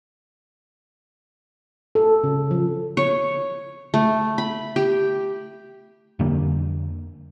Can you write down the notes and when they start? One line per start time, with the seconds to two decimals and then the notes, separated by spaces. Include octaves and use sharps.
1.95 A4
2.24 C#3
2.51 F3
2.97 C#5
3.94 A3
4.38 B5
4.76 G4
6.19 F2 D3 G3 A#3